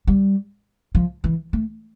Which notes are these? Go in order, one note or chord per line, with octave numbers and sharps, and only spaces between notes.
G3
F3
E3
A3